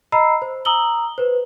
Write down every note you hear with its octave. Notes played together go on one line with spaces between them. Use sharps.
D#5 A#5 B5 E6 C7
C5
A#5 D#6 E6 F#7 G7
B4 C5